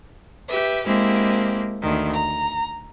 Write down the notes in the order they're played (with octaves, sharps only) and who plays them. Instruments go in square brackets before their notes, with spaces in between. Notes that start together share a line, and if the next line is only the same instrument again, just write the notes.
[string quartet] G4 B4 E5
G#3 A#3 C4 E4 G4
D2 D#3
A#5